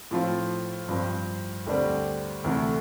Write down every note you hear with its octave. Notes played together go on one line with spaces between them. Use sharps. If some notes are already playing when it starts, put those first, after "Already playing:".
A2 F3 C4 F4
G2 F3 C4
D2 D3 G3 C4
D2 C3 E3 A3 E4